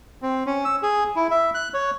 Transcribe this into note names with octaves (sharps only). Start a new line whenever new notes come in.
C4
C#4
E6
G#4
E4
E5
F#6
C#5